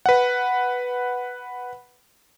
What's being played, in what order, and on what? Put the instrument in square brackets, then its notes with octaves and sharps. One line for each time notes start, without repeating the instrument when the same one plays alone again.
[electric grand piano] B4 F#5